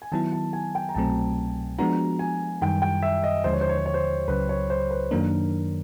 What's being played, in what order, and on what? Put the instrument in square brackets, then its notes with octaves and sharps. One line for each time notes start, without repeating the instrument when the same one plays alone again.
[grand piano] G#5
[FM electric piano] D#3 F#3 B3 E4 [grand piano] A5
[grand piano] A5
G#5
G5
A#5
[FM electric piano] C2 B2 F#3 A3 C4 [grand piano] A5
[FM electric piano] F3 G#3 B3 D4 F#4 [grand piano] A#5
[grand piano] G#5
[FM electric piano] F#2 D#3 G3 [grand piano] G5
[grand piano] G5
E5
D#5
[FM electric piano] D#2 D3 F3 G#3 [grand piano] C5
[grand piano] C#5
C5
C#5
C5
C#5
C5
[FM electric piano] C#2 C#3 F#3 [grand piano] B4
[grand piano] C#5
C5
B4
[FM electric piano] F#2 D#3 F#3 A#3 D4 [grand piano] A#4